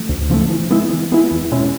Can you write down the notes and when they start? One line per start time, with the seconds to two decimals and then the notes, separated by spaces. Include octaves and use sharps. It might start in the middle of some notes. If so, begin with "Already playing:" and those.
Already playing: C#3 F3 A3
0.09 D2
0.30 C#3 F3 A3
0.50 E3
0.71 G#3 B3 E4
0.91 E3
1.12 G#3 B3 E4
1.31 E2
1.52 B2 G#3 C#4 E4